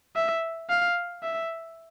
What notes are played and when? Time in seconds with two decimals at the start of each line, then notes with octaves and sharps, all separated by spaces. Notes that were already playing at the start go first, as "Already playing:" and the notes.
0.16 E5
0.70 F5
1.23 E5